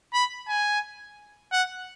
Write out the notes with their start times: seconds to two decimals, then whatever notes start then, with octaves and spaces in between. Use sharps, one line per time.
0.14 B5
0.48 G#5
1.52 F#5